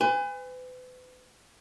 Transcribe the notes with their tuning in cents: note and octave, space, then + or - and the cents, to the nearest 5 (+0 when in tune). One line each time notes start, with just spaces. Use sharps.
B4 +40 G#5 -35